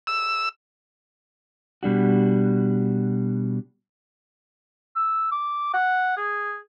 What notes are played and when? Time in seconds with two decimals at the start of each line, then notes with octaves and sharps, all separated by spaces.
0.07 E6
1.83 B2 G3 D4 F#4
4.96 E6
5.32 D6
5.74 F#5
6.17 G#4